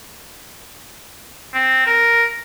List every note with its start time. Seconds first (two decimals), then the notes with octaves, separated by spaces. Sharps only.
1.54 C4
1.86 A#4